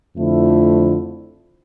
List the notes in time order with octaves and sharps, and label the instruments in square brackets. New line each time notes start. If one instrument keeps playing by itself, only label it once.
[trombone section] F2 D3 F3 A3 E4